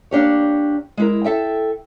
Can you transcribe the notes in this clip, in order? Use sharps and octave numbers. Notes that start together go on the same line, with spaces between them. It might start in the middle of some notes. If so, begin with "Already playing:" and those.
A#3 D4 G4 C#5
G#3 E4 A#4
A4 E5 G5